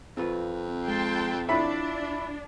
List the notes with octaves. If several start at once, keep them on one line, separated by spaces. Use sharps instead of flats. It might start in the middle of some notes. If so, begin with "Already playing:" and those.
F2 C4 F4 B4
G#3 G5 A5 C6
D4 E4 F4 C#5 E5 B5